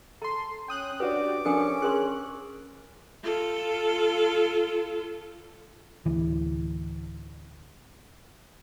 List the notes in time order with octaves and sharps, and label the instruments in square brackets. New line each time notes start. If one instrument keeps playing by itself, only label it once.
[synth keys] A4 C6 [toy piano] A#5
[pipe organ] C#4 [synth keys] G5 D#6 F#6
[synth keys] D4 F#4 G4 [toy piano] B4 C#5 [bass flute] D5 [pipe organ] D6
[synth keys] F3 D4 C#7 [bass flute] C#4 [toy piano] A4 A#4 G#5
[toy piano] G#4 A#4 C6 [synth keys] F#6
[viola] F4 A4
[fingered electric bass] D1 E3